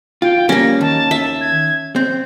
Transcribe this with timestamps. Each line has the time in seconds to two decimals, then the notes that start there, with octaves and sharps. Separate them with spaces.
0.22 F4 G5
0.49 G3 A#3 C#4 A#6
0.81 D#2 A5
1.11 E5
1.41 G#6
1.96 C4 G6